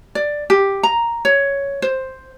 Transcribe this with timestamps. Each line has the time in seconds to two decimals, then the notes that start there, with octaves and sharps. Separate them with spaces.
0.15 D5
0.50 G4
0.83 A#5
1.25 C#5
1.82 C5